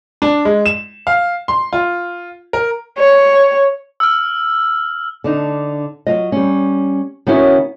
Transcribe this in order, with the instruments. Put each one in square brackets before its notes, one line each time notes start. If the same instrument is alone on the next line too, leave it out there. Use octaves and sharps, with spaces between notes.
[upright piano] D4
G#3
E7
F5
C6
F4
A#4
[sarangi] C#5
[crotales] E6 F6
[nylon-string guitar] D3 D4 D#4
F#3 F4 D#5
G3 C#4
D#3 B3 C#4 E4 F#4 C#5